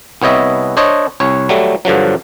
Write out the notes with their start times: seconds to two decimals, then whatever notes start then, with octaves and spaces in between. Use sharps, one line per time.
0.22 C2 B3 C#5 D#5 E5
0.77 D4 C5 C#5 D#5
1.20 C2 C#5
1.49 F#3 G3 A3
1.85 G2 D3 F3 F#3